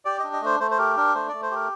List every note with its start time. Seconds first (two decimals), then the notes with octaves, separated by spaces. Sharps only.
0.05 G4 D5
0.20 D4 D#5
0.33 D#5
0.41 A3 C5
0.60 A3 C5
0.71 C5
0.78 G4 A#4
0.97 D4 A#4
1.14 A3 C5
1.29 A3 D5
1.42 C5
1.51 G4 A#4